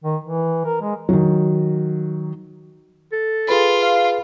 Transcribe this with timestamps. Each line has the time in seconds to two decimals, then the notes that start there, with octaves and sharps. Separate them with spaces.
0.04 D#3
0.24 E3
0.65 A#4
0.82 G#3
1.09 D#3 F#3
3.12 A4
3.48 F4 G#4 B4 B5
3.82 F5